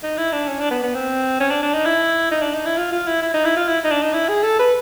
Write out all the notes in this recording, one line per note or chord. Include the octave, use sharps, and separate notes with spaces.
D#4
E4
D4
C#4
D4
B3
B3
C4
C#4
D4
D4
D#4
E4
D#4
D4
D#4
E4
F4
F4
E4
E4
D#4
E4
F4
E4
D#4
D4
D#4
E4
G#4
A4
B4